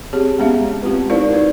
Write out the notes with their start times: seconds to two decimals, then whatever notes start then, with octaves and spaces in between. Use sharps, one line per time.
0.13 C4 G4 G#4 C#5
0.39 G#3 B3 C#4 G4 E5 F5
0.82 G#3 C4 F4 G4 B4
1.10 D#4 E4 A#4 C5 D5 F5
1.31 D#4 F#4 B4